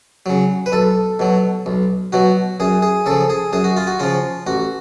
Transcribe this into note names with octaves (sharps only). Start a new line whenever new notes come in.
C#3 F#3
B4
B1 A4
B2 F#3
B1
B2 F#3 F#4
F#2 G#4
G#4
C#3 F3 A4
G#4
F#2 G#4
F#4
F4
F#4
C#3 F3 F4
A1 F#4